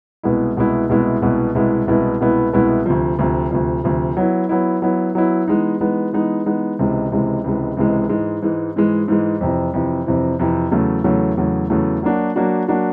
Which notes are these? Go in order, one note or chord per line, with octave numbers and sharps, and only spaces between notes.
C2 B2 G#3 B3 E4
C2 B2 G#3 B3 E4
C2 B2 G#3 B3 E4
C2 B2 G#3 B3 E4
C2 B2 G#3 B3 E4
C2 B2 G#3 B3 E4
C2 B2 G#3 B3 E4
C2 B2 G#3 B3 E4
D2 C3 F3
D2 C3 F3
D2 C3 F3
D2 C3 F3
F#3 B3 E4
F#3 B3 E4
F#3 B3 E4
F#3 B3 E4
E3 G#3 B3 D#4
E3 G#3 B3 D#4
E3 G#3 B3 D#4
E3 G#3 B3 D#4
C#2 C3 E3 G#3
C#2 C3 E3 G#3
C#2 C3 E3 G#3
C#2 C3 E3 G#3
G#2 E3 G#3
G#2 E3 G#3
G#2 E3 G#3
G#2 E3 G#3
F2 C3 E3
F2 C3 E3
F2 C3 E3
F2 C3 E3
E2 C#3 F#3 A3
E2 C#3 F#3 A3
E2 C#3 F#3 A3
E2 C#3 F#3 A3
F#3 A#3 D4 F#4
F#3 A#3 D4 F#4
F#3 A#3 D4 F#4